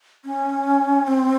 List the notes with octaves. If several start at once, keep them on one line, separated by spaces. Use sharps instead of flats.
C#4
C4